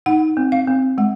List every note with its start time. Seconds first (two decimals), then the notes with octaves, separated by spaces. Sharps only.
0.06 D#4 F#5
0.37 C4
0.52 F5
0.67 C4
0.98 G#3 F#5